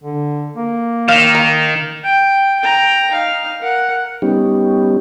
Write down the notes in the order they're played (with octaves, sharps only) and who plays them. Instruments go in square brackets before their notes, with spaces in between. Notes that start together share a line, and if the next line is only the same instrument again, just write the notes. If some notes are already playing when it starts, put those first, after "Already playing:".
[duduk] D3
A#3
[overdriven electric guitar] D#3 [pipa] F5
[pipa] A#4
[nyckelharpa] G5
G5 A#5
D#4 F5
A#4 F#5
[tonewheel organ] G3 B3 C#4 D#4 G4